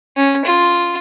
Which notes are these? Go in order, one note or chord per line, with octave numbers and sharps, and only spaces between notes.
C#4
F4